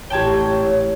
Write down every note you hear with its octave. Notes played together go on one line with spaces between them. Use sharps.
A1 G4 C#5 G5 A5 G#6 G7